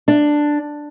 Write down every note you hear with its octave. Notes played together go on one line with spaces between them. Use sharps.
D4